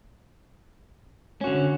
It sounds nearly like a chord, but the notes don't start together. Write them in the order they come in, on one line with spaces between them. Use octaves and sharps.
C#4 F#4 D3